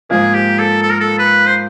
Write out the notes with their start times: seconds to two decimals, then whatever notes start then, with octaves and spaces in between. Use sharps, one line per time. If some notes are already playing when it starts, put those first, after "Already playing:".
0.10 G#2 F3 A#3 G#4
0.34 G4
0.59 A4
0.82 A4
0.91 A#4
1.00 A4
1.19 B4
1.46 C5